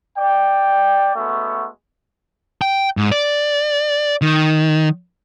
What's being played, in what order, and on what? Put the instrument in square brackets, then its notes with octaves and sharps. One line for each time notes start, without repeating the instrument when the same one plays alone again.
[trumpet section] D5 G5
G#3 A3 B3 C#4 F#4
[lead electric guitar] G5
G#2
D5
D#3